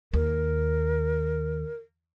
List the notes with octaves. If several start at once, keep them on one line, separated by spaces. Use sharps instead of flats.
D#2 A#4